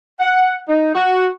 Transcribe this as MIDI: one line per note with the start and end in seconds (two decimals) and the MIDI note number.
0.19 0.55 78
0.68 0.92 63
0.95 1.25 66